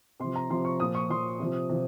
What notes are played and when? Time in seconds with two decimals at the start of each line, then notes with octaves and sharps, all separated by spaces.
0.20 C3 F3 C6
0.36 A#5
0.50 C3 F3 C6
0.65 C#6
0.80 A#2 F3 D#6
0.95 C#6
1.10 A#2 F3 C6
1.39 C3 F3
1.69 C3 F3